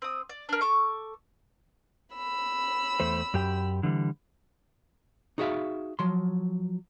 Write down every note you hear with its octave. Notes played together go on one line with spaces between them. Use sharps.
C4 D#6
D5
D4 A#4
A4 C#6 D6
B5 E6
E2 A3 C5
F#2 G4 G5
D3 E3 G3
D#4 F#4 G#4 C5 E5 F5
F3 F#3 C6